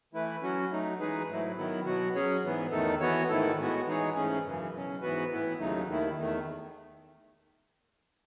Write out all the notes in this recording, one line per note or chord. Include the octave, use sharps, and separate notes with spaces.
E3 A3 E4 B4
F#3 C#4 F#4
F#3 A3 D#4
E3 G#3 D#4 G#4 B4
G#2 F#3 A3 E4
D#3 F#3 B3 E4
B2 F#3 B3 F#4
F#3 C#4 G#4 C#5
G#2 E3 B3
E2 D#3 A3 D#4 A4
E3 B3 F#4 C#5
G#2 D#3 A3 E4 A4
A2 G#3 B3 F#4
E3 G#3 D#4 G#4 C#5
G#2 E3 A3 C#4 G#4
F#2 C#3 E3
B2 F#3 C#4
G#2 E3 B3 F#4 B4
A2 E3 B3 E4 B4
D#2 C#3 F#3 A3 D#4
D#2 D#3 A3 E4
E2 D#3 A3